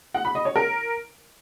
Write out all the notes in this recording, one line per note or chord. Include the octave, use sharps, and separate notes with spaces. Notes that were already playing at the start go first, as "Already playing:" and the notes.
F#5
B5
D#5
C#5
A#4